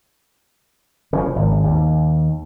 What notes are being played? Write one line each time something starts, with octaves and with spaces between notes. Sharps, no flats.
C#3 E3 F3
G#1
D#2